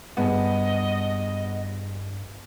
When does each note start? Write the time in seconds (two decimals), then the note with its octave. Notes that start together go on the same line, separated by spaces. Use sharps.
0.17 G2 B3 G#4 D#5 A5